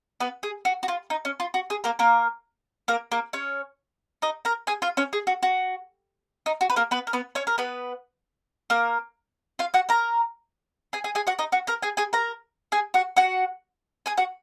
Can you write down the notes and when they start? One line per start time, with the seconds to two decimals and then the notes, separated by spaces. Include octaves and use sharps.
0.20 B3 B4
0.43 G#4
0.65 F#4
0.83 F#4
0.88 F4
1.10 D#4
1.25 C#4
1.40 F4
1.54 F#4
1.70 G#4
1.84 A#3 A#4
1.99 A#3 A#4
2.88 A#3 A#4
3.12 A#3 A#4
3.33 C#4 C#5
4.22 D#4 D#5
4.45 A#4 A#5
4.67 G#4 G#5
4.82 F4 F5
4.97 C#4 C#5
5.13 G#4
5.27 F#4
5.43 F#4
6.46 D#4
6.61 F#4
6.70 B4
6.76 A#3 A#4
6.91 B3 B4
7.07 A#4
7.13 B3 B4
7.35 C#4 C#5
7.47 A#4
7.58 B3 B4
8.70 A#3 A#4
9.59 F4 F5
9.74 F#4 F#5
9.89 A#4 A#5
10.93 G#4 G#5
11.04 G#4 G#5
11.15 G#4 G#5
11.27 F#4 F#5
11.39 D#4 D#5
11.52 F#4 F#5
11.67 A#4 A#5
11.83 G#4 G#5
11.97 G#4 G#5
12.13 A#4 A#5
12.72 G#4 G#5
12.94 F#4 F#5
13.17 F#4 F#5
14.06 G#4 G#5
14.17 F#4 F#5